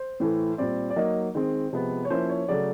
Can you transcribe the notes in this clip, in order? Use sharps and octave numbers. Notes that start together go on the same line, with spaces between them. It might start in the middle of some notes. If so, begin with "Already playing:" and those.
Already playing: C5
A2 E3 A3
A#2 G3 C4 D5
D5
F#3 A#3 D#4 D#5
D#3 G#3 C4
C3 F3 G#3 B3
C#5
F3 A#3 C#4 E4 C5
C#5
C#3 F#3 A3 D5